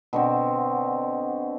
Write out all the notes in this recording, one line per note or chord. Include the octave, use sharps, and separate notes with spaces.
B2 D3 C4